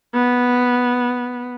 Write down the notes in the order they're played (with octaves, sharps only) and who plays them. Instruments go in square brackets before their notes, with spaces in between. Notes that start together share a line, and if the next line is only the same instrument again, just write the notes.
[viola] B3